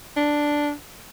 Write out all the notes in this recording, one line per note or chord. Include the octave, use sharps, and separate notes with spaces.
D4